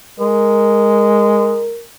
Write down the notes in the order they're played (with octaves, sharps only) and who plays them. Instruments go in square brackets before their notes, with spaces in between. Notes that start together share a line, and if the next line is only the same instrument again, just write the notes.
[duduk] G#3 [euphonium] A#4